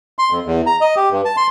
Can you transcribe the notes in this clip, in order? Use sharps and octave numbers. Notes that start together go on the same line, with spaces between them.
C6
F2
E2
A#5
D#5
G4
G2
A5
C6